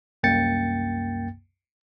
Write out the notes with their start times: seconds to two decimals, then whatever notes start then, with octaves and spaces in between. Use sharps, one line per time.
0.23 C2 F#2 A#3 G5 A6 C#7